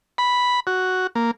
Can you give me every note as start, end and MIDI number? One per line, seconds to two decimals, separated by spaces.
0.18 0.60 83
0.67 1.07 66
1.15 1.31 58